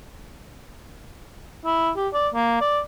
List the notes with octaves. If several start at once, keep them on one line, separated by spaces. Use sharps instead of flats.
E4
G4
D5
A#3
D5